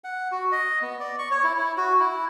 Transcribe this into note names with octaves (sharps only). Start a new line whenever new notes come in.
F#5
F#4
D#5
B3
D5
C#6
C#5
E4
E4
F#4
E4